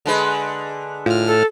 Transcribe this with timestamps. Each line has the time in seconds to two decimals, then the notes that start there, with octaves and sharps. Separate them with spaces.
0.06 D3 G#3 B4
1.06 A2 F4 F6
1.27 A4